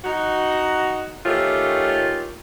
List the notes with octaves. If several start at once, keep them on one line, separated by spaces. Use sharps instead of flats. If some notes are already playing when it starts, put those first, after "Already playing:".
D#4 F#4
D#3 A3 C#4 F4 G4